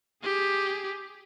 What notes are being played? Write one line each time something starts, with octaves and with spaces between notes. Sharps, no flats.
G4 G#4